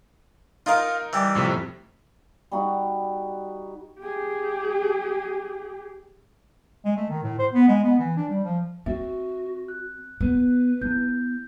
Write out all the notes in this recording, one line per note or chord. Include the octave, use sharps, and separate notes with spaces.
D#4 F4 A#4 D#5 F5
E3 G3
F2 A2 C3
G3 D#4 F#4
G4 G#4
G#3
A3
D#3
A2
C5
B3
G#3
B3
E3
D4
G3
F3
C4 F#4 E5
F#6
B3 B4
B3 E4 G6